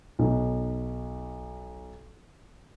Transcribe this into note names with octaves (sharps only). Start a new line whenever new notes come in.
B1 D#4